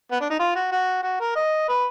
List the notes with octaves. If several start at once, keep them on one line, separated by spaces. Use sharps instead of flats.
B3
D4
D#4
F4
F#4
F#4
F#4
A#4
D#5
B4